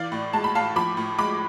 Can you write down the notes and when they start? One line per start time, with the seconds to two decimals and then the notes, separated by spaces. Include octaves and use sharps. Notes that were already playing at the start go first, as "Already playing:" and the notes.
Already playing: E3 D5 F5
0.12 A2
0.33 G#3 A5
0.44 B5
0.55 A2 F5 A5
0.76 F3 B5 D6
0.97 A2
1.19 G#3 B5 D6